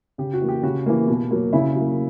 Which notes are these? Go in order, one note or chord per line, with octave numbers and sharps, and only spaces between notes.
C#3 G4
F#4
E3 A#3
G4
C#3 F#4
E3 A#3
B2
F#3 A#3
C#3 E4
F#3 A#3